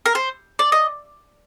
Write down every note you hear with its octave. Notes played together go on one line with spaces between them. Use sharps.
A#4
C5
D5
D#5